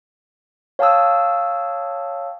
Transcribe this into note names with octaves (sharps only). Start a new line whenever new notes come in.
C#5 F5 G5 A5 D#6 E6